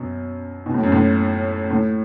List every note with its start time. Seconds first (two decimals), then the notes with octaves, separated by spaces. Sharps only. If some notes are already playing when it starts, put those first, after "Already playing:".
Already playing: F#2 B2
0.66 B2
0.74 A2
0.83 F#2
0.92 A2
1.71 A2